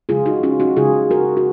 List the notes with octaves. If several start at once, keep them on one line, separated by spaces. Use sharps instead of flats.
C#3 G#3 F4 G#4
D#4 F#4
C#4 F4
D#4 F#4
C#3 G#3 F4 G#4
F#4 A#4
F#4